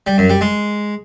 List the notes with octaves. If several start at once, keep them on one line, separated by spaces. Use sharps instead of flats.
G3
F#2
G3
G#3